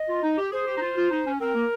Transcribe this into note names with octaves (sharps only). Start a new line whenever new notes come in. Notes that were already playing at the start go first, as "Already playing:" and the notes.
Already playing: D#5
F4
D#4
G4
G#4 C5
G4
D#4
F4
F4
D#4
C#4
C4 A#4
A#3